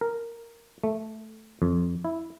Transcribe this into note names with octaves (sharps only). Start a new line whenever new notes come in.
A#4
A3
F2
E4